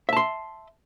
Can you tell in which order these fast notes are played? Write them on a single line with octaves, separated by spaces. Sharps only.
E5 A5 C6